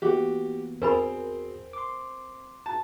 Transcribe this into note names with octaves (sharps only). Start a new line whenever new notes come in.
E3 A#3 B3 F#4 G4
E2 C4 F#4 G#4 A#4 G#5 B5
C6 D6
A5